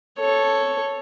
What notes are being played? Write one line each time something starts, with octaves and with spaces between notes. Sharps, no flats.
A4 C#5